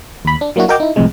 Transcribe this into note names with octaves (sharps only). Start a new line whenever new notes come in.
D#2 B5
D4
F#3 A#3 D4 E4 F#4
F#4 A#4 D#5 G5 A#5 D6
D#4 E4
C2 F2 A2 C3 G#3